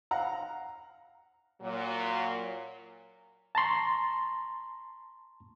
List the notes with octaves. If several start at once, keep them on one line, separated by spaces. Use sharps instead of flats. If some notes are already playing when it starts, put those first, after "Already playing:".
F5 F#5 A#5
A#2 F#3
A5 A#5 C6 C#6